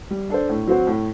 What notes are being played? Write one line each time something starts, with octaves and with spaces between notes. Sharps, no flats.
G3
D4 A4 C5
A2
F#3 C4 F#4 C5
A2